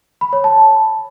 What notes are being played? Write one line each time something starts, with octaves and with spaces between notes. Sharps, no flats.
B5
C#5
A5